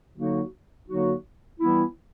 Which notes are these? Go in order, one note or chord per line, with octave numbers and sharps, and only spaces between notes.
D3 F#3 A#3 D#4 F#4
D3 F#3 A#3 D#4 F#4
E3 G3 B3 E4